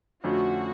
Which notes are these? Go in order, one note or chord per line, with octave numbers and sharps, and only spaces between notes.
F2 D3 F3 A3 C#4 F#4